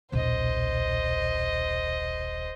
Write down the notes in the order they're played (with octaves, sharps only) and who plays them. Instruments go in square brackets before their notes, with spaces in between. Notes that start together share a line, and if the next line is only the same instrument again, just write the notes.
[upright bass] D#1 B1 [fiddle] C5 D#5